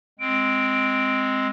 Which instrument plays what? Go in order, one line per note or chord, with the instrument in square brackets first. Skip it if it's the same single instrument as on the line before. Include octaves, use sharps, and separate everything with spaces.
[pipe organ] G#3 C4 [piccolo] D7